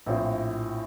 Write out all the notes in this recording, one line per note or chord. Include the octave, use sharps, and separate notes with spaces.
A#1 A2 F3 C4 F4